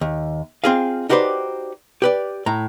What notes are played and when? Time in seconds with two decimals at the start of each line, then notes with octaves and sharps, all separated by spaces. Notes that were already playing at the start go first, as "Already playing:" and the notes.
0.01 D#2
0.64 C4 F4 G#4 D#5 F5
1.09 D#4 F#4 G4 B4 C5 D5
2.02 G4 B4 D5
2.46 A2 A#5